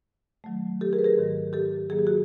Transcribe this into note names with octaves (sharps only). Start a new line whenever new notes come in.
D#3 F#3 A3
G4 A4
G#4 A#4
B4
G#4 A#4
G#2 D#3 F#3
G4 A4
D#3 F#3 A#3 G#4
G4
F#4 G#4